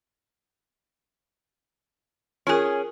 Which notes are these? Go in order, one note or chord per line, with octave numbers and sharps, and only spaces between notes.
C#4 F4 G#4 A#4